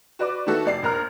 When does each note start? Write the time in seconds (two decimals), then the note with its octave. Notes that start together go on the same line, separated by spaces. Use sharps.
0.19 F#4 B4 D5 D6
0.46 D#3 A3 B3 F#4 A4
0.66 F1 D5 C7
0.83 A#1 A#4 A#5 F6